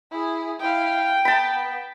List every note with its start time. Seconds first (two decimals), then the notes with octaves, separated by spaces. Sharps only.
0.11 E4 G#4
0.60 E4 F5 G5
1.25 B3 A5 B5